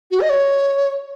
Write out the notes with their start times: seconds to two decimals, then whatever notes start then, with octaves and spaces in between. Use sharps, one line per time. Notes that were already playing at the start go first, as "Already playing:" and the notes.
0.11 F#4
0.20 D#5
0.29 C#5